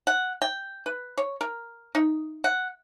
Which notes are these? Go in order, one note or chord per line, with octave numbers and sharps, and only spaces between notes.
F#5
G5
B4
C#5
A#4
D#4
F#5